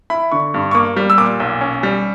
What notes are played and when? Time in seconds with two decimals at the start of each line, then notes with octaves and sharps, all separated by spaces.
0.10 E4 B5
0.32 D3 C#6
0.54 G2
0.71 C#6
0.75 A#3 D6
0.96 G3
1.10 E6
1.18 A#2 D6
1.40 B1
1.61 C#4
1.83 G3